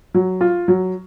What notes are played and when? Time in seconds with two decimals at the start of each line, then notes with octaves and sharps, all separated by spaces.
0.15 F#3
0.41 F4
0.68 F#3